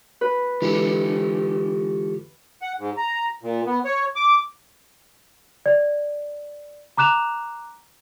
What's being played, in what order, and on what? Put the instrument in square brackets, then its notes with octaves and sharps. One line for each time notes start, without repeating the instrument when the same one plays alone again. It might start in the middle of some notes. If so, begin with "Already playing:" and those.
[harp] B4
[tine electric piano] D3 E3 G#3 [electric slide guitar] F4 G4 A4
[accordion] F#5
G#2
A#5
A#2
B3
C#5
D6
[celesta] D5
A#5 D6 F#6 E7 F7